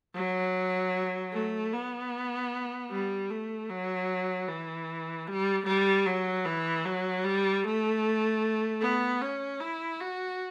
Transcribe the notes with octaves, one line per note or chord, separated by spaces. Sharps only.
F#3
A3
B3
G3
A3
F#3
E3
G3
G3
F#3
E3
F#3
G3
A3
B3
C#4
E4
F#4